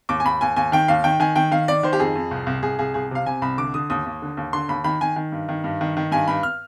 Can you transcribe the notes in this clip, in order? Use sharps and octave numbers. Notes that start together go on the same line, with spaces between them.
D#2 D6
G#5
D#2 B5
D#2 G#5
D#2 G#5
D#3 G5
D#2 F5
D#3 G5
D#3 G#5
D#3 G5
D#3 F5
D#3 D5
D#3 C5
G4
F2 G#4
F2
C2
C2
C2 G#4
C2 G#4
C2 G#4
C3 F5
C3 G#5
C2 B5
D3 D6
D3 D#6
D#2 D#6
D#2
D3
D#2
D3 C6
D#2 B5
D#3 B5
D#3 G#5
D#3
G2
D#3
G2
D#3
D#3
G2 G#5
G2 B5
F6